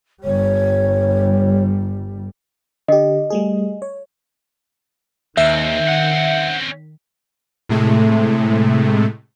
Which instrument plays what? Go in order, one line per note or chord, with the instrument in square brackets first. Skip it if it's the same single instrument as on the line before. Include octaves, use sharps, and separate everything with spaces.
[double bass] G1 G3 [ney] C#5
[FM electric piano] D3 G4 [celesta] D#5
[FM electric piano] G3 A3 G#4
C#5
[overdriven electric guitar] D#2 [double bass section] D#3 [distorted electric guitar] C4 C#4 [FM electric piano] E5
[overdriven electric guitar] F#5
[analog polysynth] A2 C3 G#3 A3